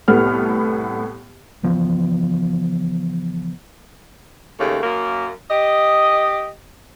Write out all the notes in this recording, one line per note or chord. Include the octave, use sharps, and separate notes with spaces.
C2 A2 B3 A4 F6
C#3 E3 F3 B3
D#2 C#3 A3
F#2 A#3
G4 D#5